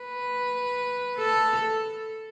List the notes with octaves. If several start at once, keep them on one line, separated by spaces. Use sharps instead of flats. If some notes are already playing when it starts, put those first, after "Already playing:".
Already playing: B4
A4